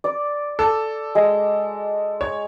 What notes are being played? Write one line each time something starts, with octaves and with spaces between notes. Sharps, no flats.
D5
A4
G#3
C#5